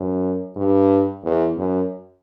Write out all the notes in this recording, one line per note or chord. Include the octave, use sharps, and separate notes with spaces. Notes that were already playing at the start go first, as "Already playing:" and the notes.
Already playing: F#2
G2
E2
F#2